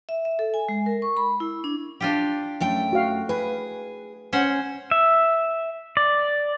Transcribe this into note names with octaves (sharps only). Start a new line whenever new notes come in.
E5
E5
A4
G#5
G#3
A#4
C#6
B5
E4
D4
D4 F4 G4
F#2 A3 G5
F#4 F5
G#4 B4
C#4 C5 F#5
E5
D5